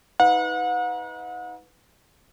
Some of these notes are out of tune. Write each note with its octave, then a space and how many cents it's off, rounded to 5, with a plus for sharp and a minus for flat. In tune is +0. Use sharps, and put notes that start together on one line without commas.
D#4 +35 B4 +15 F#5 -40